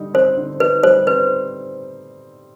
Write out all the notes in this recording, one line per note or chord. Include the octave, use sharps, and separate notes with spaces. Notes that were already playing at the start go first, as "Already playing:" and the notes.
Already playing: D3 G3 D#4
C4 C5
D3
D#4 B4
G3 C5
C4 B4